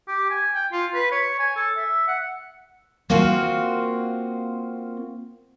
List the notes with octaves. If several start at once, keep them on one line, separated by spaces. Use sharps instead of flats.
G4
G#5
G5
F4
B4
C#5
G#5
A4
E5
F#5
A#3 C4 F4 F#4